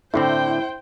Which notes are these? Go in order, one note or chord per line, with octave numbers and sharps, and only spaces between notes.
A2 D3 C4 E4 C5 G5